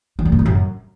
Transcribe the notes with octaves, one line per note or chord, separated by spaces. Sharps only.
D#3
A#2
G2
A2
F#2